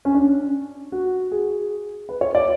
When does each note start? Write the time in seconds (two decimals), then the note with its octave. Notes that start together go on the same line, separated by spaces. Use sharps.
0.05 C#4
0.14 D4
0.92 F#4
1.32 G#4
2.09 B4
2.21 C#5
2.35 D5